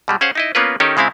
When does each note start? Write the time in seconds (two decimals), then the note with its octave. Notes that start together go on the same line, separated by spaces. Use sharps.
0.08 B2 G3 G#3
0.21 C#4 G#4 C5 F5 F#5
0.35 D#4 E4 D#5
0.55 A#3 B3 C#4 F4 A#4 B4
0.80 D#3 C#4 D#4 G4 A4 A#4
0.97 C#3 G#3 C4 E4 F5